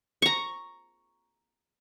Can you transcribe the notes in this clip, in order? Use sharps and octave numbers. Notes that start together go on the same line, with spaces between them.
A#5 C#6